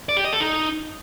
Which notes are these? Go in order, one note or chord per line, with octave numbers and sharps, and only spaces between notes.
D5
G4
D#5
A4
D#4